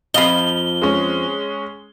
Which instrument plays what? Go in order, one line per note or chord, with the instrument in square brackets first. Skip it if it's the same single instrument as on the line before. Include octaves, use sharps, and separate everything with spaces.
[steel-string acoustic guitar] F2 F3 [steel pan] D#5 F5 B5 [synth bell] G7
[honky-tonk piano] G#3 C#4